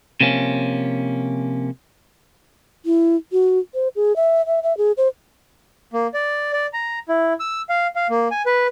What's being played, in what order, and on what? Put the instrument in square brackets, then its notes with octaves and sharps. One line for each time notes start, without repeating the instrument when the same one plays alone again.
[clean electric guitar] C3 F3 A#3 C#4
[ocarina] E4
F#4
C5
G#4
E5
E5
E5
G#4
C5
[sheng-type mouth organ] A#3
D5
D5
A#5
E4
E6
F5
F5
A#3
G#5
B4